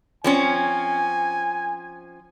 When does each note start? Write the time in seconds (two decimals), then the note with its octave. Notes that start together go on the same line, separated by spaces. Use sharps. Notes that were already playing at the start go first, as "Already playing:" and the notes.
0.24 F3 C4 C#4 G#5